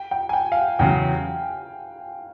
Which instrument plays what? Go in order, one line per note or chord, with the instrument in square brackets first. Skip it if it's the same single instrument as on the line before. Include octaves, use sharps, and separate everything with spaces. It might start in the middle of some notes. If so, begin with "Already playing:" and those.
Already playing: [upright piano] G5
G5
G#5
G5
F5
F#5
[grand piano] E2 C#3 F#3 [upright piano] G5